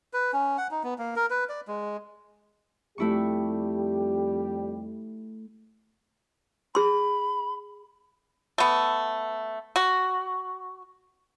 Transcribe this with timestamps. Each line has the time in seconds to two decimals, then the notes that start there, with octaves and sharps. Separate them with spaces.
0.13 B4
0.33 C#4
0.58 F#5
0.71 D#4
0.84 B3
0.99 A#3
1.16 A#4
1.30 B4
1.49 D5
1.68 G#3
2.98 F2 G3 A3 E4 G4 C#6
6.75 G#4 B5 C6
8.58 A3 B3
9.76 F#4